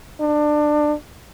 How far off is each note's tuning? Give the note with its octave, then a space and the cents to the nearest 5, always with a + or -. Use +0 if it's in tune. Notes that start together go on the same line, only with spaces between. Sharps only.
D4 +25